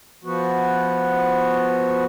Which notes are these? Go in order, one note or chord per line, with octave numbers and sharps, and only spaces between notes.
F3 B3 F#4